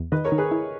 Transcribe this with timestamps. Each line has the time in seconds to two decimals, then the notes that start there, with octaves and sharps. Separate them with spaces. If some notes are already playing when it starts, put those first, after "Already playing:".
Already playing: E2
0.12 D#3 B4 D#5
0.25 A#4 C#5
0.32 D#3
0.38 G#4 B4
0.51 E4